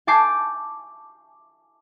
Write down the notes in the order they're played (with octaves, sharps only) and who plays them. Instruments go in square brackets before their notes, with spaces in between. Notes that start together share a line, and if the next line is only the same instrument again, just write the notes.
[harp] G#5 A5 D6 G6 C7